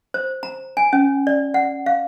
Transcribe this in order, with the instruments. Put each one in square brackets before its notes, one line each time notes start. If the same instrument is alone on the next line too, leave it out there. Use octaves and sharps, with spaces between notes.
[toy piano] C5
A#5
G#5
C#4
D5
F#5
F5